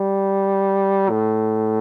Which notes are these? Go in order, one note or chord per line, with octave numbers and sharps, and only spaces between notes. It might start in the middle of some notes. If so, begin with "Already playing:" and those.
Already playing: G3
A2